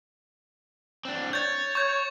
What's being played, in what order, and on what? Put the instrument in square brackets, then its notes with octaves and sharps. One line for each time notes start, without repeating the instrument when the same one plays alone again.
[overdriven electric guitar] C4 D4
[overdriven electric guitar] C#5 [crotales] G6 A6
[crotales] C#6 G6 G#6